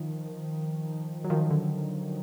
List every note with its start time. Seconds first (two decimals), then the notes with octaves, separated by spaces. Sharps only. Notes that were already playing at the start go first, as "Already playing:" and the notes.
Already playing: D#3 F3
1.24 F#3
1.30 D#3 F3
1.50 D3